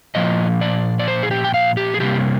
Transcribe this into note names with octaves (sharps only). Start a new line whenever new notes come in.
A#2 F3 A#3 D#5
D5
D5
C5
G#4
G4
G5
F5
G4
G#4
C3 G3 A#3 G4